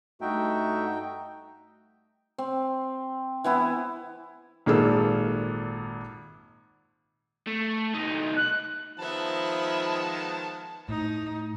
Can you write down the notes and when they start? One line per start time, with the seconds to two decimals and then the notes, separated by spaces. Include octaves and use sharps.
0.21 G2 A3 D#4 F#4 E5 G5
2.38 C4
3.44 E3 B3 E4
4.66 G#1 A#2 A#3 G#4 A4 E6
7.47 A3
7.94 C2 D#4
8.36 F#6
8.99 D#3 F3 G#3 B3 E5 A5 B5
10.89 A2 A3 D#4